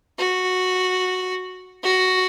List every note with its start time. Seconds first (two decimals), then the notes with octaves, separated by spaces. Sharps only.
0.19 F#4
1.84 F#4